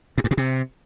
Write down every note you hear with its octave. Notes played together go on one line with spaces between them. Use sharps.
A2
G2
B2
C3